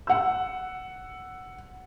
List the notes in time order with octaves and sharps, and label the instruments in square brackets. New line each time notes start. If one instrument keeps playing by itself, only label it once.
[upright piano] F#5 E6